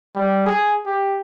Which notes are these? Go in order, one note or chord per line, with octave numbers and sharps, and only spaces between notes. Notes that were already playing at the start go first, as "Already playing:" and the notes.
G3
G#4
G4